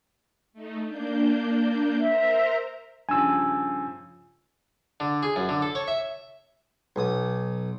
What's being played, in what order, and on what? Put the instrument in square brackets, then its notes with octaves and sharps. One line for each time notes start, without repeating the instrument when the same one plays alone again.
[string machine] A3 D#4
A#3 D4 G6
[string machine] A#4 C5 A#5 [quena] E5
[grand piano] G2 C#3 F3 [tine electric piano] G#5 E6
[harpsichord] D3
G#4
F#2
D3
A4
C#5
E5
B1 D#6